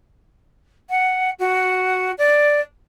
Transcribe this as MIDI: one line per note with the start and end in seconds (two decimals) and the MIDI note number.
0.90 1.30 78
1.39 2.11 66
2.18 2.60 74